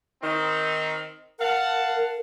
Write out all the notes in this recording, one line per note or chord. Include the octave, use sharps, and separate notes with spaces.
D#3 C4 D#4
A#4 F5 F#5 A5